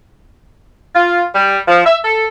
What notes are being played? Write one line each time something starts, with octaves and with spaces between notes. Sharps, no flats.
F4
G3
F3
E5
A4